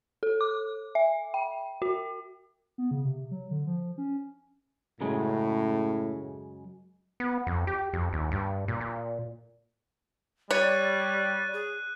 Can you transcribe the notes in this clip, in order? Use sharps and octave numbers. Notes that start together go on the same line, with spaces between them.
A4
D6
E5
G5
F#4
B3
C#3
C3
F#3
D3
F3
C#4
F#2 A2 C#3 G#3
B3
F2
G4
F2
D#2
G2
A#2
A#2
G3 C#5 D5 F#6 D#7
G#4